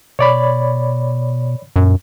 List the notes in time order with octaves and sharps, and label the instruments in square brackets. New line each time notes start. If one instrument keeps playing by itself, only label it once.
[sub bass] B2 [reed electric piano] C#5 D5 B5
[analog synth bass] F#2 [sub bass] A#2